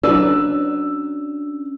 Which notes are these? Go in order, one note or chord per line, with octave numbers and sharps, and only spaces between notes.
F#3 C#4 D4 B4 D5 E6